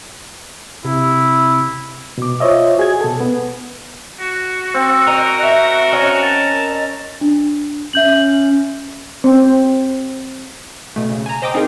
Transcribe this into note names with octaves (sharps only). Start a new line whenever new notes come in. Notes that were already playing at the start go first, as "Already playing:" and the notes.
C3 E4
B2 D6
F4 C5 C#5 D#5 E5
F#4 G#4 D#5 G#6
B2 A4
B3
F#4
C4
A#4 D#5
E5
C#4 D#5
A5
D4
C#4 E5 G6 F#7
C4
B2 A3
C#3
G#5 A#5
C5 D#5 G5 D6 D#6
C4 D#4 F4 G#4 A#4